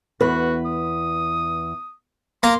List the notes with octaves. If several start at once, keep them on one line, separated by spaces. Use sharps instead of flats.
E2 F#4 B4
D#6
A#3 A#5 C6